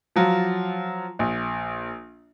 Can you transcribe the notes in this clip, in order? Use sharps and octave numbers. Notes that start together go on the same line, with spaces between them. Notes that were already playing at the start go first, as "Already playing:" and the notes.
F3 F#3 F4
A#1